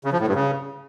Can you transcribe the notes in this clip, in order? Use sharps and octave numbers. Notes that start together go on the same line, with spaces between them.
C#3
F3
A2
G2
C#3